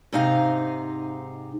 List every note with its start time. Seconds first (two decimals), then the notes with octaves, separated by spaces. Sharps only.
0.12 G#2 C3 D#4 F5 A#5